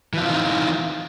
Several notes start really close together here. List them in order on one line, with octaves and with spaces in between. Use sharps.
E3 F3 C4 F4 D#4